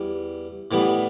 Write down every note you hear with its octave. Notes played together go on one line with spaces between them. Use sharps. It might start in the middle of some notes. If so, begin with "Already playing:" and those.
Already playing: E2 G3
A2 E3 G3 B3